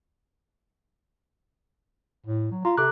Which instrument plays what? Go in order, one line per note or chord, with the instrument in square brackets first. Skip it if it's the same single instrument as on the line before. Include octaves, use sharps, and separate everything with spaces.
[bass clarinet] A2
F#3
[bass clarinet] F4 [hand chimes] A#5
[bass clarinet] C3 [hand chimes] A4 D6 F#6